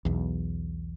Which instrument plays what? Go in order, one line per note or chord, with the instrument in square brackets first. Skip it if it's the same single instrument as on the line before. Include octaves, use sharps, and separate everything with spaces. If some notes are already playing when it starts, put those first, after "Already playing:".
[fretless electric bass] B1 E2